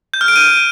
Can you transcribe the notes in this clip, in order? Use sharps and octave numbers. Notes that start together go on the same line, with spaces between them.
G6
F6
D7
D#7